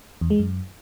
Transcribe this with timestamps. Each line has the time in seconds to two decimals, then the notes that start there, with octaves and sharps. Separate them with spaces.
0.21 E2
0.30 G#3
0.39 F#2